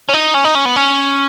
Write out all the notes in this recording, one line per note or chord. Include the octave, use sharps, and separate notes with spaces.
C#4
D#4
C#4
D#4
C#4
B3
C#4